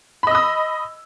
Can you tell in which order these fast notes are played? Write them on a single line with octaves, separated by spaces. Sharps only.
B5 D#5 E6 D#6